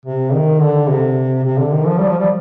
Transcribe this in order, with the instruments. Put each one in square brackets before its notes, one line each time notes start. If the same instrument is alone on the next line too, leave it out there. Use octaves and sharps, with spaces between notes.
[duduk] C3
D#3
D3
C3
C3
D3
D#3
F3
G3
F3
G3